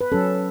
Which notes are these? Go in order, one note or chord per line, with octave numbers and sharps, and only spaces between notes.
B4
F#3 C#4 A4